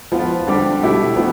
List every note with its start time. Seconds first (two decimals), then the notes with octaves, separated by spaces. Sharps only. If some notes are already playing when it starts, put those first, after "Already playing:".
0.12 F3 B3 F4
0.47 D3 G3 D4 G4
0.82 B2 A3 E4 G4
1.16 F3 B3